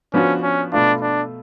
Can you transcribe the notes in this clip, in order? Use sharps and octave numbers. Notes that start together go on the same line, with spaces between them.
F3 B3 C#4 D4 F#4
C#4
B2 A3 D4 F4
D4